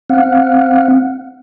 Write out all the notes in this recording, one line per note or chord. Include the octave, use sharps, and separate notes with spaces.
C4 F5 F#5